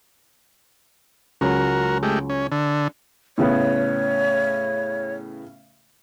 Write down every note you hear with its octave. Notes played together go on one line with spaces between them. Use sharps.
C#2 F#3 F#4 A#4
G#3 A3 G4
C#4
D3
A2 C#3 B3 C#5